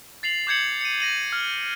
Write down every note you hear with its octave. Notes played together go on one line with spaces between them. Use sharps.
A6 C7 F7 F#7
D6 G6 G#6 C#7 F#7
C#7 D#7
A#6 D#7 F#7
F6